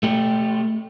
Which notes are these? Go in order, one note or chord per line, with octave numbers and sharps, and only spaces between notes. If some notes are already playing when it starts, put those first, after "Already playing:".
A3 G4